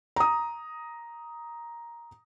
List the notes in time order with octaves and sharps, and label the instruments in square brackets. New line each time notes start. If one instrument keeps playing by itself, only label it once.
[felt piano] A#5 D#6